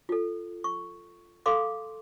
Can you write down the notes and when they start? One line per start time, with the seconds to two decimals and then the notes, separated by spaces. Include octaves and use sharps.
0.09 F4 A4
0.64 C#6
1.46 A4 F5 C6 D6